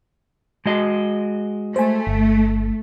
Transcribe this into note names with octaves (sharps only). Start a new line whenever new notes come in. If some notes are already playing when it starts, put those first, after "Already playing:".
G#3 F#4 D#5
A3 C5 G#5
G1